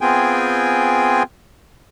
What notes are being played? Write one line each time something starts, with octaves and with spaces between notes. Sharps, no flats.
B3 C4 F4 G#4 G5 G#5